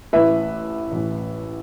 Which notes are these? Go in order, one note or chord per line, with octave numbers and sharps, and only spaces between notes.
A1 A2 E3 B4 E5
A1 A2 E3